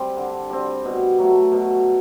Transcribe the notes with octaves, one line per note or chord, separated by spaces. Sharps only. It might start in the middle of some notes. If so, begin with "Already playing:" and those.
Already playing: G3 C4
D3
G3 C4
B2
F#3 A3
B2